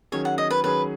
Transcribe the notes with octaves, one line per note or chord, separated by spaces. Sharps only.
D#3 F#3 C#4 G#4 C#5
F#5
D#5
B4
D#3 F#3 C#4 G#4 B4